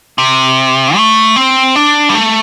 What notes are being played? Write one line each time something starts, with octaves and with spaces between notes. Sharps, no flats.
C3
A3
C4
D4
G3
A3